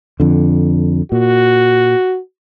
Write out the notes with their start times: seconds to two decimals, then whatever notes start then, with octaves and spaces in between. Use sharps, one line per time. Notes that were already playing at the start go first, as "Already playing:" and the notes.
0.20 F2 D3
1.12 A#2 F#4